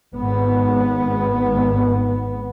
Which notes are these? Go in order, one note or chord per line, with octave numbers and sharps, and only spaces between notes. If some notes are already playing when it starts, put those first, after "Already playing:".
G#1 B3